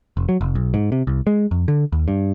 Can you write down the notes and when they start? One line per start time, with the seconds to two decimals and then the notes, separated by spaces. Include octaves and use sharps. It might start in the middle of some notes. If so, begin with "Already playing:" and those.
0.17 F1
0.29 F#3
0.41 F1
0.55 B1
0.74 G#2
0.92 C3
1.07 C2
1.27 G#3
1.51 F2
1.68 D3
1.92 D#2
2.08 G2